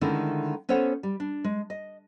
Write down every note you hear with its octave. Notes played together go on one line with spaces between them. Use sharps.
D3 D#3 G#3 A3 C#4 E4
B3 C#4 A4 C5 C#5 F#5
G3
D4
G#3
D#5